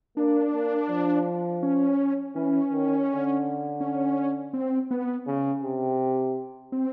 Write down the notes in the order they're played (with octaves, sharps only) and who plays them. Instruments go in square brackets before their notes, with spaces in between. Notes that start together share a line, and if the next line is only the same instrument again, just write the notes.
[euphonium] A#3 [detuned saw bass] D4
[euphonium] A#3
F3
[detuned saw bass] C#4
[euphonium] E3 [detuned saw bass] C#4
[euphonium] D#3
D3
[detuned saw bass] C#4
C4
B3
[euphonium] C#3
C3
[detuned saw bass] C4